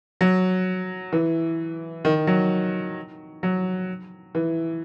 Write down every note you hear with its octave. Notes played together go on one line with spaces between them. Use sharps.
F#3
E3
D#3
F#3
F#3
E3